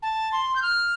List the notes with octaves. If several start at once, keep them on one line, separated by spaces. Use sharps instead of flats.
A5
C6
G6
F6